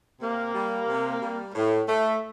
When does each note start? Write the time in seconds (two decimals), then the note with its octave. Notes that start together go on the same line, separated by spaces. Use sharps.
0.21 C3 A#3
0.55 G3
0.88 C3
1.22 G3
1.55 A2
1.89 A3